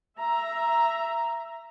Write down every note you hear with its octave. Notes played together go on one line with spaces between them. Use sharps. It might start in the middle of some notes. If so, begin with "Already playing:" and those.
E5 A#5